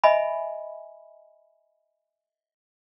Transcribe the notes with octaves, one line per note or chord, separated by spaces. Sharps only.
D#5 E5 G#5 B5